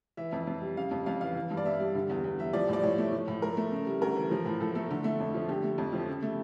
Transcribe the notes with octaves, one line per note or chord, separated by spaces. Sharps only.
E3 E5
F2
F2
G3
C#3 F5
F2
F2 F5
E3 F5
E3
G2
D5
G2 E5
G3
D3
E2
E2
G3 E5
F3 D5
A2 D5
A2 C#5
A3
F3
A2
A2 A#4
A3
C#3
G3
D2 A#4
E3
F3
A2
A2 A4
A3 A4
D3
A3
F2
F3
D3 G4
A3
F2
F3
C#3
A3